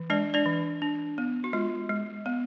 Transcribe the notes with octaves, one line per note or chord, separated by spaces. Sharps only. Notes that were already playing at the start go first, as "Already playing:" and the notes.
Already playing: E3
G#3 D4 D5
D4 D5
E3
D4
B3
F#4
G#3 F4
G#3
B3